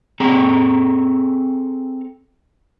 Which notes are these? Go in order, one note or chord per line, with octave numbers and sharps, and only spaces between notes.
C4 G#4 A4 A#5